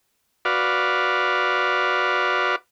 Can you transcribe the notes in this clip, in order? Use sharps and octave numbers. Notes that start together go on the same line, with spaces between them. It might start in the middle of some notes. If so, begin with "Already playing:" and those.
F#4 B4 D5 F5